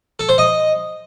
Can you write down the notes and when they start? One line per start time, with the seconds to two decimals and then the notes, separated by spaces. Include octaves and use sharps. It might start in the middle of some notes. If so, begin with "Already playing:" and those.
0.19 A4
0.29 C5
0.38 D#5